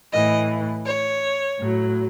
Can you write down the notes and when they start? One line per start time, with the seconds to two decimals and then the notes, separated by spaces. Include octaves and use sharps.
0.12 A2 E3 D#5
0.85 C#5
1.58 A2 F#3